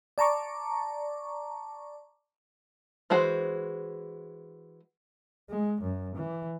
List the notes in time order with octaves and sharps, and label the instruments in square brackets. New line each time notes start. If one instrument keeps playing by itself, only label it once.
[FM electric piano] D5 A5 A#5 C#6 D6
[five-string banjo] E3 G#3 F#4 C5
[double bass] G#3
F#2
E3